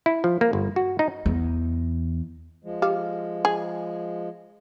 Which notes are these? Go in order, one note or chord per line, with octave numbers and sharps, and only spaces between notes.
E4
F3
A#3
G1
F#4
D#4
E2
F3 G#3
G4 F5
G#4